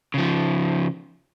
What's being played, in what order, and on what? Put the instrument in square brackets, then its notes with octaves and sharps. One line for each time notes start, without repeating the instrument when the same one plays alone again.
[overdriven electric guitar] C#3 F3